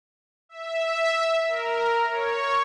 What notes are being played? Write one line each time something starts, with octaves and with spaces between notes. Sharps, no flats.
E5
A#4
C#5